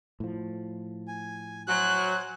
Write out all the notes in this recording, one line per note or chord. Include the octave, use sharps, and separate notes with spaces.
A2 F3
G#5
F#3 C5 G#5 F#6